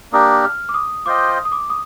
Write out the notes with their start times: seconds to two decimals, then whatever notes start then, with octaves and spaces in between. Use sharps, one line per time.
0.12 A#3 D4 G4 A#4 D#6
0.44 F6
0.69 D6
0.74 D#6
1.06 F4 C5 D#5 G5 D6
1.29 D#6
1.45 D#6
1.52 D6
1.70 D#6